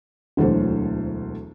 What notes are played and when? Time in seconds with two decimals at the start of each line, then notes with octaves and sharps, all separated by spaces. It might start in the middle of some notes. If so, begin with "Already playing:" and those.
0.37 E1 D2 E3 F#3 A4 C5